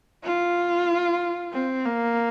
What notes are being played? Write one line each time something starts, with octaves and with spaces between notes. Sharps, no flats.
F4
C4
A#3